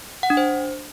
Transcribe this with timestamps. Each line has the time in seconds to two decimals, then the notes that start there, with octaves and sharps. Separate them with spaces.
0.23 F#5
0.30 D4
0.37 C5